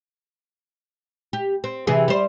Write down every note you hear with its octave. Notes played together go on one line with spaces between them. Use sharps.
G4
C4
C3 E3 G#4
G3 C5